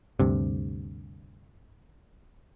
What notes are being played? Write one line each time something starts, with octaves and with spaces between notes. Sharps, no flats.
D2 G2 C3